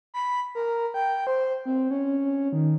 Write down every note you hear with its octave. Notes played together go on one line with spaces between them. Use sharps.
B5
A#4
G5
C5
C4
C#4
D#3